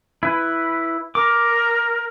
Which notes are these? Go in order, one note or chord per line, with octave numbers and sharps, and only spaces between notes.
E4 B4
A#4 D6